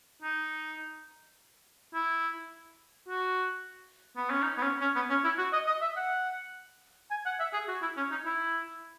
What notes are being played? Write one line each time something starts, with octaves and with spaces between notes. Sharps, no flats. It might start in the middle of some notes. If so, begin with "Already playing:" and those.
D#4
E4
F#4
B3
C#4
D#4
B3
C#4
C#4
B3
C#4
E4
F#4
D#5
D#5
E5
F#5
G#5
F#5
E5
G#4
F#4
E4
C#4
D#4
E4